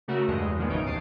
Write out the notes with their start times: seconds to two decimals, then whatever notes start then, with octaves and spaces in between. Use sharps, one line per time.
0.08 C#3 A3 F#4 A#4
0.28 E2 G2 G#3 D#5
0.57 A#2 D#3 F3 G#3 B3
0.70 G#1 C#3 E3 D#4 C#5 D7
0.86 A1 D#2 A5 D#6 C7 D7